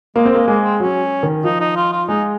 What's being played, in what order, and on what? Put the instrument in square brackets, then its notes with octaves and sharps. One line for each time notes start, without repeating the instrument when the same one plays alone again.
[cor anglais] G#3 [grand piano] A#3
[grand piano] C4
[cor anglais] G#3 [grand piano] A#3
[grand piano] G#3 [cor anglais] A#3
[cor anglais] C4
[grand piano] F#3 [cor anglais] C#4
[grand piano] D#3
[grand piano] F3 [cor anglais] D#4
[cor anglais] D#4
F4
F4
[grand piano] G#3 [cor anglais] D#4